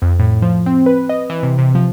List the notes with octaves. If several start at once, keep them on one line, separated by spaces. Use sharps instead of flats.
F2
A2
F3
C4
B4
D#5
E3
C3
C3
F3